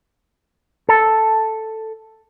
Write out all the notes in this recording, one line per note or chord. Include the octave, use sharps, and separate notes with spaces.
A4